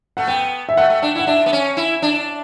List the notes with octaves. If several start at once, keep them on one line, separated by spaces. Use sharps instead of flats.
A3 F#5
B3 G5
E5
A3 F#5
A3
D4
E4
F#5
D4 E5
B3
C#4
E4
D4